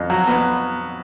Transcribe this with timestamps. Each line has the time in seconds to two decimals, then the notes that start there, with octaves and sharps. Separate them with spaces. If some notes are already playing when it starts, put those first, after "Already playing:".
Already playing: F2
0.10 F#3
0.28 B3